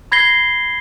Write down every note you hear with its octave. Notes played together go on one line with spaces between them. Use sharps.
B5 G#6 A#6 C7 G7